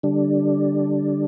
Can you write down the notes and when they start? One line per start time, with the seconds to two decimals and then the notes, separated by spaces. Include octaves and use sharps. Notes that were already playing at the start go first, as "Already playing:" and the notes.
0.03 D3 G3 D4